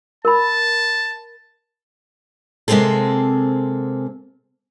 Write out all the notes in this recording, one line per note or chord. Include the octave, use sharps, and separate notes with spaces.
A#4 A5 B5
C3 G#3 A#3 C4 G#4 A4